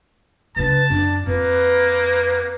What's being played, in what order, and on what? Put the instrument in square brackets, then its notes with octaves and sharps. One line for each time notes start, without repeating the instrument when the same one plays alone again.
[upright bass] C#3 D4 [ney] B4 [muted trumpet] A5
[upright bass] F#2 [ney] D4
[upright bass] F2 [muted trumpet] A#3 [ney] B4